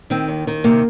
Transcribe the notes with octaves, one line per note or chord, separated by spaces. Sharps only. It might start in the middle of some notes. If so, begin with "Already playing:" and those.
D#3 C4
D#2
D#3
C3 A#3